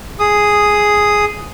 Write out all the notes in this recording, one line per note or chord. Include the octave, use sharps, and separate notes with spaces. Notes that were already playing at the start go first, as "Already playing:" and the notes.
G#4 D#6